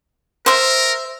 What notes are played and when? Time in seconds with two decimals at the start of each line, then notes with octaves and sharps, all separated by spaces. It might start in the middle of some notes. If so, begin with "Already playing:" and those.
0.46 A#4 C5 E5